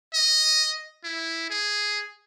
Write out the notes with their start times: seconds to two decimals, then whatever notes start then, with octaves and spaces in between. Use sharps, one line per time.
0.14 D#5
1.04 E4
1.50 G#4